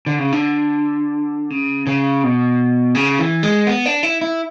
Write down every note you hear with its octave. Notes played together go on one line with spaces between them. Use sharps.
D3
C#3
D3
C#3
C#3
B2
C#3
E3
G#3
B3
D4
E4
E4